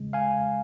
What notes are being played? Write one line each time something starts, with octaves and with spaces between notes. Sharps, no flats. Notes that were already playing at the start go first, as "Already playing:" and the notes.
Already playing: C#3 G#3
F5 G#5